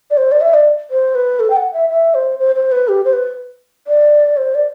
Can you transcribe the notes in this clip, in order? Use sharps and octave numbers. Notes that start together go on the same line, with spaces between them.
D5
C5
D5
E5
D5
C5
B4
A4
G5
F#5
E5
E5
C5
C5
C5
B4
G4
C5
B4
D5
C5
D5